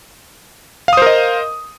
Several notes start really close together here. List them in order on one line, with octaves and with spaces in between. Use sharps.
F5 D#6 C5 A#4 D#5